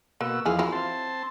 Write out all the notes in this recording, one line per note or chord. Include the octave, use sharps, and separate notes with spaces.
B2 A#3 F#4 E6
E2 F3 E4 G#4 F5
F#3 E4 F4
C4 A5 C6